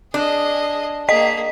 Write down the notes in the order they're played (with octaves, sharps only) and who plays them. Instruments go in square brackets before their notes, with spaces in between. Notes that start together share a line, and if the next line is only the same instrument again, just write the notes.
[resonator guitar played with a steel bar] D4 [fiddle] G#4 D#5
[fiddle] A#3 G#4 [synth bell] D#5 B6